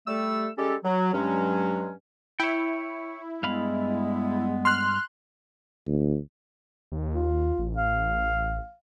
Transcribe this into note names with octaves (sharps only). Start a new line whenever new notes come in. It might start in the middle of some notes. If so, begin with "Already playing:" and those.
G3 A3 A4 E6
G3 G#3 C#4 G4 A4
F#3
G2 F#3 G#3 C#4
E4 C#5 G5
G2 G#3 B3 F5 B5
C6 F6 F#6
D2
D#2
F4
A1
F5